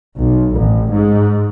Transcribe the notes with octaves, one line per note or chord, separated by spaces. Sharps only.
B1
A1
G#2